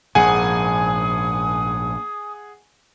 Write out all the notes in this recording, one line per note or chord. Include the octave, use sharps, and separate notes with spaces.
A#1 G#2 G#4 F#5 G#5 D#6